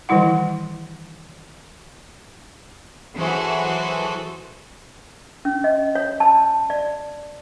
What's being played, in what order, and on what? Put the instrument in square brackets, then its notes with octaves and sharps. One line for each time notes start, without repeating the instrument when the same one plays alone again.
[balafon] D#3 E3 G3 E4 F#5
[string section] E3 F#3 F#4 G#4 A4 C5
[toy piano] C#4
D#5
C#5
A5
D5